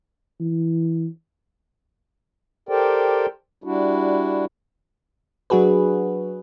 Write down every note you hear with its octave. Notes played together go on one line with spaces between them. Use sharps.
E3
G4 A4 A#4 C5 D5 G5
G3 D4 E4 F#4
F#3 D4 F#4 G#4 B4